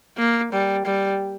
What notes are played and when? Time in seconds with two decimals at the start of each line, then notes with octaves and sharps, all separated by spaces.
0.17 A#3
0.52 G3
0.85 G3